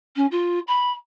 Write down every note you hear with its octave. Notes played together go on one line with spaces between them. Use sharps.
C#4
F4
B5